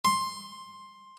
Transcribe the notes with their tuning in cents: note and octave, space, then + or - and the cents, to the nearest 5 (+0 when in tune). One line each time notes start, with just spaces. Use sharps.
C6 +10